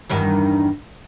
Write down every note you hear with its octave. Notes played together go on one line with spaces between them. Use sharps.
E2 G2 D#3